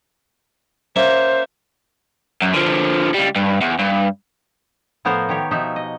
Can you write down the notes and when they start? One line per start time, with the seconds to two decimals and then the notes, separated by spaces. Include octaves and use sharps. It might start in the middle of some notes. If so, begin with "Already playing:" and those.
0.96 A#3 C#4 C5 E5
2.42 F#2
2.54 D3 F3
3.14 C#2 G3
3.36 G2
3.61 E2
3.79 G2
5.05 A2 F3 B3 A#4 C5 C#5
5.29 D#3 G4 C#5
5.51 B2 F3 D#4 E5
5.76 D#5